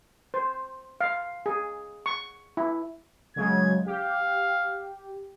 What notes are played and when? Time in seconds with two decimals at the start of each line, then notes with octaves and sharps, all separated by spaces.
0.34 C5
1.01 F5
1.46 G#4
2.06 C#6
2.57 E4
3.36 C#3 F#3 G#3 G#6
3.86 G4 F5